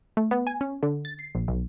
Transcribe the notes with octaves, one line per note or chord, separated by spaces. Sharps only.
A3
B3
G#5
C#4
D3
A6
C7
A#1
B1